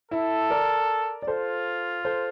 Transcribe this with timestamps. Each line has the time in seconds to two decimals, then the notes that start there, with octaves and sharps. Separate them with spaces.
0.11 E4 A4
0.50 A#4 D5
1.22 D5
1.27 F4 A4 C5
2.05 A4 C5